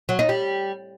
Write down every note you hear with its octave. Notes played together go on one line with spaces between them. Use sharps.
F#3
D#4
G3